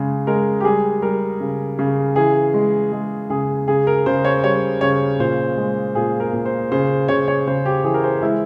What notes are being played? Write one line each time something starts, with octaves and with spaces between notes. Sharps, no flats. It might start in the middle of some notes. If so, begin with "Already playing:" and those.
Already playing: C#3 G#3
G#3 A#4
G4
G3 G#4
G3 A#4
C#3
C#3
E3 G#4
G#3
G#3
C#3 G#4
C#3 G#4
A#4
C#3 C5
C#5
G3 C#5
C#3 C#5
A#2 C5
G#3
A#2 G#4
A#4
A#2
C5
C#3 C5
C#3 C#5
C#5
C#3 C5
G4
E3 G#4
A#4
C5
G#3 E4